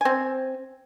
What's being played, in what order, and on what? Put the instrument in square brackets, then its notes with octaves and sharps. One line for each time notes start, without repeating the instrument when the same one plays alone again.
[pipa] C4 G#5